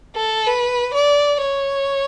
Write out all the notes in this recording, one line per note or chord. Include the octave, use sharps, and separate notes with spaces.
A4
B4
D5
C#5